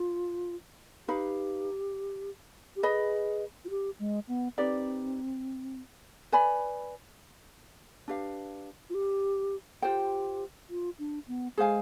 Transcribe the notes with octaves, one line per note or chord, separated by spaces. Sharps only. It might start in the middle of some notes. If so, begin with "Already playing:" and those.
Already playing: F4
D#4 G4 B4 F5 B5
G4
G#4 B4 D#5 B5
F4
G4
G#3
B3
C4 D#4 G4 B4 D5
B4 D5 G#5 B5
D4 G4 B4 F5
F4
G4
F4 G4 C5 G5
F4
D4
B3
G#3 G#4 C5 F5 G#5